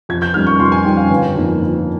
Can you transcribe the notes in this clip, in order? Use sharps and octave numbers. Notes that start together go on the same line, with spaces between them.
F2 G#6
G6
D#3 G3 C#4 F6
C#6
F2 C6
G#5
D#3 G3 C#4 G5
F5
G1
F2 D#3 A#3
G1